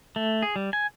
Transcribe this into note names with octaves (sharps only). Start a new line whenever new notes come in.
A3
G#4
G3
G#5